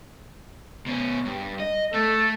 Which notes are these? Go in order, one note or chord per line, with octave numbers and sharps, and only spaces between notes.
B2 C#4
G2
D#5
A3 A4